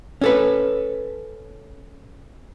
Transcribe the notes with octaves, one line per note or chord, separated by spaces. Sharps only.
C#4 A4 B4